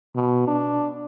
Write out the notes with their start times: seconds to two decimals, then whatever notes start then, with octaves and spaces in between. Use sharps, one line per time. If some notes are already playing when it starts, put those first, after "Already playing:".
0.16 B2
0.48 D4